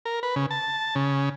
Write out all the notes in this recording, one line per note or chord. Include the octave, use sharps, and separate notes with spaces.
A#4
B4
C#3
A5
C#3